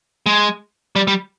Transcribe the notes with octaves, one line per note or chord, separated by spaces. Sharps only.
G#3
G3
G3